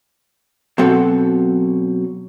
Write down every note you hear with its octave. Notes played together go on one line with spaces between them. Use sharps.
B2 F#3 C4 A4 F#5